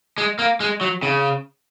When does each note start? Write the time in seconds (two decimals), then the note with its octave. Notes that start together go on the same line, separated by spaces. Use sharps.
0.18 G#3
0.39 A#3
0.60 G#3
0.81 F#3
1.03 C#3